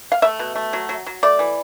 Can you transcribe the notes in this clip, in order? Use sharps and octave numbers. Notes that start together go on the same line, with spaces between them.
F5
A3 E5
B2
A3
F#3
F#3
F#3
A3 D5
E3